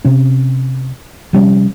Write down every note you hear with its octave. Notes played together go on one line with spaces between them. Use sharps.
C3 C#4
C3 F3 G3 C#4